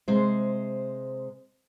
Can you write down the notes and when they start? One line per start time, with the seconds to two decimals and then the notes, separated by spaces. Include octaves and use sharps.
0.08 C3 G#3 C5